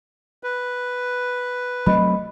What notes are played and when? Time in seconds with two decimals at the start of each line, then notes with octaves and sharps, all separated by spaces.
0.43 B4
1.86 F#3 A3 C4 D#5 B5